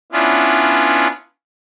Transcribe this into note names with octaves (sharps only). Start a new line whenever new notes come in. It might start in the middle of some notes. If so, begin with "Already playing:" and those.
B3 C#4 D4 E4 F4